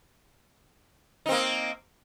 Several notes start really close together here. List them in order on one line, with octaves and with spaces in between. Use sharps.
D#4 C4 A#3